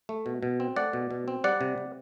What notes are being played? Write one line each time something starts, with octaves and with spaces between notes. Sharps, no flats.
A3
B2
B2
C4
A3 D5 F#5
B2
B2
C4
G3 D5 F#5
C3
C3